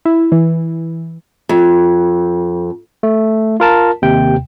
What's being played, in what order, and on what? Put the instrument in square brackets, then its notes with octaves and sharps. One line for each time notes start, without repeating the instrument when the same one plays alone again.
[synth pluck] E4
E3
[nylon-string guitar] F2
[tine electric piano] A3
F4 A#4 A5
D#2 C3 G5